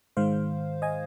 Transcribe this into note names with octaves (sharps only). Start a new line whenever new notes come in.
G#2 D#3 G#3 C5 F5
D#5 G#5